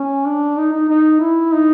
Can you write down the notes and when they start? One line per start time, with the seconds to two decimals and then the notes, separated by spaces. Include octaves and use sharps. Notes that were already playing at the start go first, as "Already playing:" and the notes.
Already playing: C#4
0.25 D4
0.58 D#4
0.73 D#4
0.89 D#4
1.21 E4
1.53 D#4